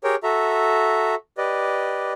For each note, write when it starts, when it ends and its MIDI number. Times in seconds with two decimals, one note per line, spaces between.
0.04 0.16 67
0.04 0.16 68
0.04 0.16 70
0.04 0.16 73
0.04 0.16 79
0.23 1.15 66
0.23 1.15 69
0.23 1.15 76
0.23 1.15 82
1.38 2.13 67
1.38 2.13 71
1.38 2.13 74
1.38 2.13 75